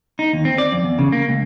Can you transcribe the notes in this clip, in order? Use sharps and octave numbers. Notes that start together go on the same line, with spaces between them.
D#4
D#2
C4
D5
F2
E2
C#3
A#3
C#2